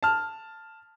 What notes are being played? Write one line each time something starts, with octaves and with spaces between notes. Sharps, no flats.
A5 F6